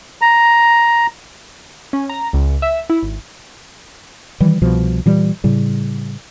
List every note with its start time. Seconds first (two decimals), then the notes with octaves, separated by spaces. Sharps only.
0.22 A#5
1.93 C#4
2.09 A#5
2.33 C#2
2.62 E5
2.90 E4
3.02 G#1
4.40 D#3 E3 G3
4.61 C2 B2 F3
5.06 A#2 E3 G3
5.44 A2 C#3 G3